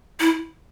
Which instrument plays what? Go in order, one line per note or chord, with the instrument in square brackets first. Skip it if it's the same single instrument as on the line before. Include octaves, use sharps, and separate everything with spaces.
[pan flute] E4